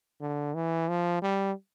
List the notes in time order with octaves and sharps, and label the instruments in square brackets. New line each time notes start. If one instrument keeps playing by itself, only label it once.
[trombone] D3
E3
F3
G3